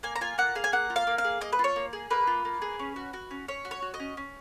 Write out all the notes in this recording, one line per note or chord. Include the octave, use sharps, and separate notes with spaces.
A#3 G#5
A#5
F4 G#5
A#3 F#5
G#4 F5
G#5
A#3 F#5
F4
F5
A#3
F5
G#4
A#3 D#5
B4
F4
C#5
A#3
G#4
A#3 B4
F4
A#3
G#4
C#4
F#4
F#4
C#4
C#4 C#5
F#4
C#5
F#4
D#5
C#4
C#4